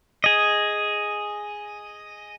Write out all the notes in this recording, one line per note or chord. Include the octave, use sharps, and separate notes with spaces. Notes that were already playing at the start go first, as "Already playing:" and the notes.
G#4 D#5